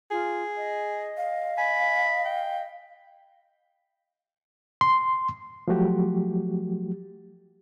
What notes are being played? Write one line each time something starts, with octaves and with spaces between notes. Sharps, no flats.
F4 G#4
D#5
F5
D#5 G#5 B5
G5
C6
F3 F#3 A3 F#4 G4